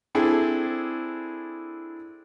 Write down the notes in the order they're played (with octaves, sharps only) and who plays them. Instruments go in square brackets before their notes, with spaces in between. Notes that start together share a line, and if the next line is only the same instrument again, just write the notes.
[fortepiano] C4 D4 E4 G#4 A4